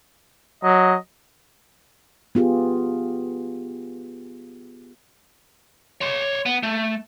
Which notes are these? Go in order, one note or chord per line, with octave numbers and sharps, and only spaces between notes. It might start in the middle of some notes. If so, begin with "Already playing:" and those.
F#3 D#5
B3 F4 G4 G#4
C#5 C6
B3
A3